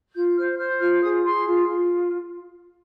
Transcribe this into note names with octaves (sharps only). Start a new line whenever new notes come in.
F4 G6
C5 F6
C5 F6
F4 F6
G#4 D#6
G#4 C6
F4
F4